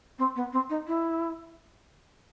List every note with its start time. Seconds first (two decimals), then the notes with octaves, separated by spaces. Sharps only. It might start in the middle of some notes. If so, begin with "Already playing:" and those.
0.19 C4
0.36 B3
0.52 C4
0.69 D#4
0.87 E4